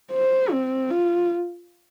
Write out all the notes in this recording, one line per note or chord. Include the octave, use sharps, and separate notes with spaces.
C5
C4
F4